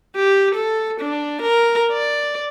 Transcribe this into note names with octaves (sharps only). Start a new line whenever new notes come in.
G4
A4
D4
A#4
D5